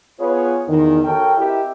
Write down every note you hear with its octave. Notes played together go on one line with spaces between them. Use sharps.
B3 F4 G#4 B4 C#5
E2 D#3
F#4 A4 A#4 C#5 G5
C4 E4 G4 A#4 D#5 E5